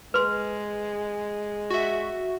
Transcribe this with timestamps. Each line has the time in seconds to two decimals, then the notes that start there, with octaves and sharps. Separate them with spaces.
0.14 G#3 B4 C6
1.70 F#4 E5